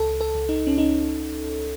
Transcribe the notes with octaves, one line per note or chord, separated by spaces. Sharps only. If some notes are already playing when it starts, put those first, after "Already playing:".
Already playing: C#2 A4
A4
C#2
D#4
C#4
D#4